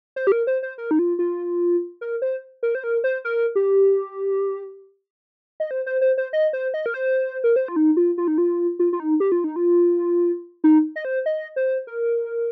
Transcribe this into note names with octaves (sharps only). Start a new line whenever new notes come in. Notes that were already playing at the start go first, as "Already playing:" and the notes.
C5
G4
A#4
C5
C5
A#4
D#4
F4
F4
A#4
C5
A#4
C5
A#4
C5
A#4
G4
D#5
C5
C5
C5
C5
D#5
C5
D#5
A#4
C5
A#4
C5
F4
D#4
F4
F4
D#4
F4
F4
F4
D#4
G4
F4
D#4
F4
D#4
D#5
C5
D#5
C5
A#4